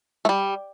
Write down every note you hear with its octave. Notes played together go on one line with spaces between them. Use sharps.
A3
G3